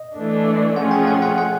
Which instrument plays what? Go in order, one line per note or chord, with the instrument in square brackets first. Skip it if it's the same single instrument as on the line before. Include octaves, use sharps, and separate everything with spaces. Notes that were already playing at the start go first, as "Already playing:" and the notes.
Already playing: [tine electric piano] D#5
[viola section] E3 A3 D4
[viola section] F3 A3 C#4 F4 G#4 [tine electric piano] F#5
[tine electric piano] G5
F#5
F#5
F#5